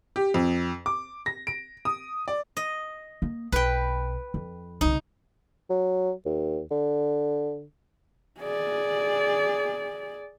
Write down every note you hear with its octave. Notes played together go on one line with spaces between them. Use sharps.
G4
F2
D6
A#6
D7
D#6
D5
D#5
A#3
B1 B4 G5
F2
C2 C#3 D#4
F#3
D#2
D3
G#4 D5